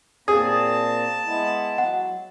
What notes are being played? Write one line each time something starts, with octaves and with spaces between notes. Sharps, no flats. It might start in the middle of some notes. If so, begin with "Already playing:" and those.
A#2 A#3 C4 G#4 A5 D#6
G#3 B3 E4
F#3 F#5